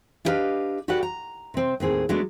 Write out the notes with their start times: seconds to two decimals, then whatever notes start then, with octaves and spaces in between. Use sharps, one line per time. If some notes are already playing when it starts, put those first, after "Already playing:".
0.25 D4 E4 G4 B4 D#5 F5
0.88 F#4 G4 A4 B4 D5 F#5
1.03 A#5
1.54 C3 C4
1.80 D#2 A2 C4 G#4
2.09 F#3 G#3 A3 B3 D4